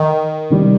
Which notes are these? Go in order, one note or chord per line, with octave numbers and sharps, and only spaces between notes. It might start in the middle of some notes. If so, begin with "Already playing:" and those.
Already playing: D#3
C3 D#3 G3